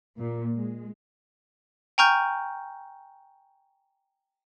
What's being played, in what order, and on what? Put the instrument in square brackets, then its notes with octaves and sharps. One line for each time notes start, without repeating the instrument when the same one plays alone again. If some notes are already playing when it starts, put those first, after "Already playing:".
[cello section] A#2
G#3
[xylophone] G5 G#5 A#5 C#6 F6 G6